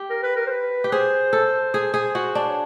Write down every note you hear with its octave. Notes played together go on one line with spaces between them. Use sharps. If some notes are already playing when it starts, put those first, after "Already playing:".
Already playing: G4
A#4
B4
A#4
C5
B4
G4
G#4 C5
A4
G#4
G#4
F#4
D4
C#5